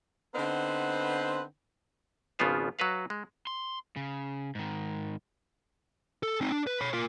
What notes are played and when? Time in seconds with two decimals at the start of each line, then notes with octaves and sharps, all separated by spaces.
0.35 D3 B3 C4 D#4 B4 C5
2.39 G#1 C#3 F3 B3 F4 C5
2.79 F#3 F#4 B4 F5
3.10 G#3
3.47 C6
3.96 C#3
4.55 G#2 D#3
6.23 A4
6.41 C4 D#4
6.52 D4
6.67 B4
6.81 C#5 B5
6.93 F4 A#4